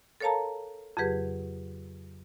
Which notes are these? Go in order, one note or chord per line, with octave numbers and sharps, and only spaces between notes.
A4 A#4 C#5 F5 A5 A#5
F2 C#3 F#3 G4 G#4 B4